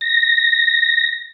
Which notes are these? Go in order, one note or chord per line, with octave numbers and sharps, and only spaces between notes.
A#6